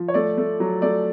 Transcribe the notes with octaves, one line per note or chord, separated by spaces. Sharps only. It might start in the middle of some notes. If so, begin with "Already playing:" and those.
Already playing: F3
C#5
A3 D5
A3
F#3
A3 D5